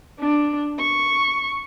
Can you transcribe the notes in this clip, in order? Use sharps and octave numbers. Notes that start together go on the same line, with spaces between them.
D4
C#6